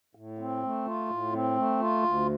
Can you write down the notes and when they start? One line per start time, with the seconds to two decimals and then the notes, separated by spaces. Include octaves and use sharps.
0.15 A2
0.39 C4
0.63 A3
0.86 F4
1.09 A2
1.33 C4
1.56 A3
1.80 F4
2.03 D2